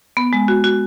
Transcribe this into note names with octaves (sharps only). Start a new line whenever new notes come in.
B3
G#3
F#4
F#4